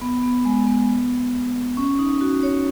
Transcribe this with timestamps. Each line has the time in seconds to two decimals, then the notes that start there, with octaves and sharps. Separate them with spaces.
0.01 B3
0.23 B3
0.45 G#3
0.67 B3
1.77 C#4
1.99 D#4
2.21 F#4
2.43 C#5